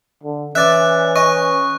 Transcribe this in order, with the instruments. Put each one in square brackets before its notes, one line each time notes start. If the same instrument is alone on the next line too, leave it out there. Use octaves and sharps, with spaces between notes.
[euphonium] D3
[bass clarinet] E3 [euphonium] C#4 [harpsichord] D5 E5 [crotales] F#6
[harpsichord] D#5 [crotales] C#6